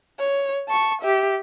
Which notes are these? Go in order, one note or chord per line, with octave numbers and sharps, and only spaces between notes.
C#5
A5 C#6
G4 E5